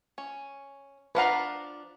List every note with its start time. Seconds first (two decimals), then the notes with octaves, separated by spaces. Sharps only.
0.18 C#4
1.15 F3 D4 B4 F5 F#5 A#5